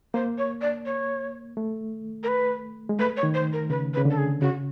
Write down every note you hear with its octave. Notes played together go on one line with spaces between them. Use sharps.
A#3 C5
C#5
D5
C#5
A3
A#4
B4
G#3
A3 B4
C#5
D#3
C5
A#4
C#3 B4
B4
C#3
D3
A4
G#4
C#3 F#4